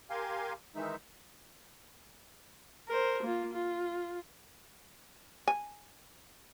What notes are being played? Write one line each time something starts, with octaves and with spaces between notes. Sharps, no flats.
G4 A#4 F5 G#5 C6
D#3 E3 G#3 D#4 E5
A#4 C5
A#3 F4
F4
G#5